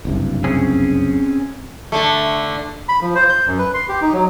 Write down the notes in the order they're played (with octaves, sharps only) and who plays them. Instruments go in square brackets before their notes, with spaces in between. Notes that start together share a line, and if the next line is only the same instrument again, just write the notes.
[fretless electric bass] F#1 C2 G2
[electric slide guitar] C4 C#4 G#4
[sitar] D3 A3
[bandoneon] B5
F3
C5
G6
F#2
B4
C6
G4
D#4
F#3